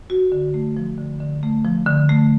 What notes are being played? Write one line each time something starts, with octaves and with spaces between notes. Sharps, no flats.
F#4
D3
A3
F3
D3
D3
A3
F3
D3
A3